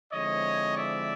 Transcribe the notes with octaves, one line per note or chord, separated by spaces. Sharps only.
D3 F3 G#3 C4 E4 C#5 D#5
D5 E5